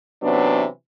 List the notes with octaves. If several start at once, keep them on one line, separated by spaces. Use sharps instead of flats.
C3 E3 F#3 B3 C#4 D4